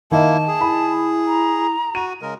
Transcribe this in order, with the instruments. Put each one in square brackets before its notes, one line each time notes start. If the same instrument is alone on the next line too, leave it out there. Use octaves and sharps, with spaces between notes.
[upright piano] D#3 D#5 [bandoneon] A#3 E4 [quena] A5
[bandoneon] G#4
[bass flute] E4 [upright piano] B5
[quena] A#5
[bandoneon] F#4 [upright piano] D#7
[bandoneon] C#3 G#3 A#4